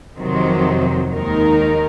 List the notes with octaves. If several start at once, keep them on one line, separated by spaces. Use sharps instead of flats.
F2 C3 D#3 F#3 C4
D#2 D#3 G#3 D#4 A#4